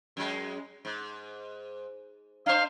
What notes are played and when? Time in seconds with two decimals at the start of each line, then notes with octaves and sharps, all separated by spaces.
0.17 F#2 G#3
0.85 G#2
2.46 D4 C5 F5